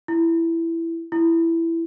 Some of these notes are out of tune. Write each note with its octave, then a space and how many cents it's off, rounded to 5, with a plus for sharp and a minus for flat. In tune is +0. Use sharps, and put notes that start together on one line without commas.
E4 +10
E4 +10